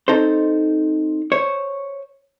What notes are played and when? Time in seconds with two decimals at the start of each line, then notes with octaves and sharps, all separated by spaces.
0.08 C4 D#4 A4 C5
1.32 C5 C#5